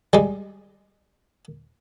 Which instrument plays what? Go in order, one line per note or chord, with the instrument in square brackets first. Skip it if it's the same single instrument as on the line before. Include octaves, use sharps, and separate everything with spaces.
[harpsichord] G3 G#3